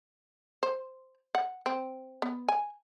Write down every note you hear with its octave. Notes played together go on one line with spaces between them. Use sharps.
C5
F#5
C4
B3
G#5